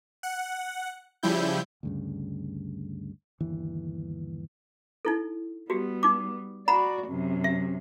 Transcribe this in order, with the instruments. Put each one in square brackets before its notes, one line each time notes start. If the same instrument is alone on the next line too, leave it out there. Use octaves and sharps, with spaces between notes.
[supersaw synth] F#5
C#3 F3 G3 E4 G6
[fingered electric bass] D2 G2 C#3
G1 D#2 E3
[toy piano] D#4 E4 A4
[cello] G3 B3 [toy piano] F#4 G4
[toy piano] D#4 D6
[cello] F#4 D5 [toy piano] F#5 A#5 B5
[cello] F#2 C3
[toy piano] E5